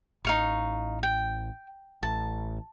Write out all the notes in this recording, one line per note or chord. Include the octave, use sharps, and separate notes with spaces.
A1 D#4 F5 C#6
G5
A1 A5